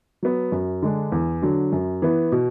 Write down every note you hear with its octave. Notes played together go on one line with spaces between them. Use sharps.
F#3 B3
F#2
D3 G#3 D4
E2
D3 F#3
F#2
E3 B3
B2